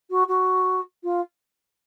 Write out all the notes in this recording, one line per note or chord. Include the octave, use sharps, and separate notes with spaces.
F#4
F#4
F4